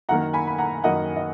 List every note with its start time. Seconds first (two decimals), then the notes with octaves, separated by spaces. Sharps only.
0.09 F#2 D#3 A#3 F#5 A#5
0.33 G#5 B5
0.47 B5
0.58 F#5 A#5
0.84 F#2 D#3 A#3 D#5 F#5
1.16 D#5